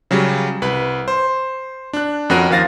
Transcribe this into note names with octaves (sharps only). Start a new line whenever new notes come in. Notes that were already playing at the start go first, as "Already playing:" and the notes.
C#3 F#3 G3
C2 B4 B5
C5
D4 F#6
F2 C#4 F#4 A#4 F#6 D#7
D#2 F3 F5 A6 A#6